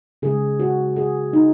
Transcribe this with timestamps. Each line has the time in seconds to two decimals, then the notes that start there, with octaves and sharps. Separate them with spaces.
0.22 C#3 G#3 G#4
0.59 F#4
0.96 G#4
1.33 D#4